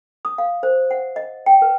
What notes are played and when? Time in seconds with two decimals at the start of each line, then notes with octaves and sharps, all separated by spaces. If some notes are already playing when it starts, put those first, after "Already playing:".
0.25 D#6
0.38 F5
0.63 C5
0.91 F#5
1.16 D#5
1.46 G5
1.62 B4